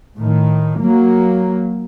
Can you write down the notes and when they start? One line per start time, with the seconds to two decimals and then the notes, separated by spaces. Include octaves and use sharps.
0.17 A2 D#3
0.80 F#3 A#3